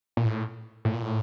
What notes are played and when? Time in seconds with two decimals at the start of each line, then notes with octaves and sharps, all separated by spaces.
0.17 A#2
0.25 A2
0.85 A2
0.93 A#2
1.02 A2